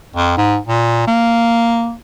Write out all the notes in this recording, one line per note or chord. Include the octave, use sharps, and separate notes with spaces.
F2
G#2
A#2
A#3